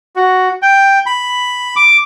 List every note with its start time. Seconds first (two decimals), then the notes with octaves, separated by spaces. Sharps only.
0.16 F#4
0.62 G5
1.06 B5
1.76 D6